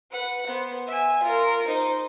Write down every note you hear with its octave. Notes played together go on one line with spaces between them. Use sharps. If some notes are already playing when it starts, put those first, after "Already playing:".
B4 F#5
B3 C5
E5 G#5
F4 A#4
D#4 C5